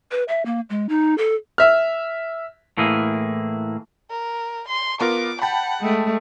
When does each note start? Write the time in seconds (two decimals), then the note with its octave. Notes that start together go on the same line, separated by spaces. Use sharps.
0.11 B4
0.28 E5
0.46 A#3
0.70 G#3
0.89 D#4
1.18 A4
1.58 E5 F6
2.77 A2 E3 A#3 G#4
4.10 A#4
4.68 C6
5.01 B3 F4 A#4 D6
5.42 F#5 G5 A5 B5
5.81 G#3 A3